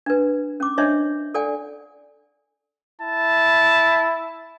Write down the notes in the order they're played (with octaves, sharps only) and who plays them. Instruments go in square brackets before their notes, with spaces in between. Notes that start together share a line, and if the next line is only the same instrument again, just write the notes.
[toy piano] D4 B4
C#4 D6
D4 C5 C#5 D#5 E5
A4 D5 F#5 G#5
[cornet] E4 [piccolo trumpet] A5